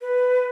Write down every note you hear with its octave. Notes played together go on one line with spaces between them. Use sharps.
B4